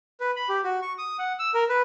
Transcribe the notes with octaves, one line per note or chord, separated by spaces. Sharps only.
B4
B5
G4
F#4
C#6
D#6
F#5
E6
A#4
B4